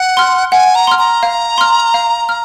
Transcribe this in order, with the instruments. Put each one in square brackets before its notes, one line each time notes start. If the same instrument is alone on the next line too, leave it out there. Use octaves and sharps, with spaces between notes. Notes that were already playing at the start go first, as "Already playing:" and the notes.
Already playing: [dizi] F#5
[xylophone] C6 F6
[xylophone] F#5 [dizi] G#5
[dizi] A#5
[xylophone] C6 F6
[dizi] A#5
[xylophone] F5
C6 F6
F5
F6